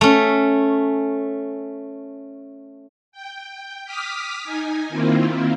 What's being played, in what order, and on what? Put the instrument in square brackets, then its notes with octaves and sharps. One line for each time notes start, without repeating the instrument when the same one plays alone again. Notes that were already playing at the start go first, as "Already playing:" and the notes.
[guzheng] A3 C#4
[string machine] G5
D6 D#6 F6 B6
D#4 G#5
D#3 A#3 C4 E4 F4